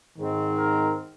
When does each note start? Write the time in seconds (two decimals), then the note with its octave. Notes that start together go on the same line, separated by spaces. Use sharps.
0.18 G#2 D#3 G#3 C4
0.57 A#4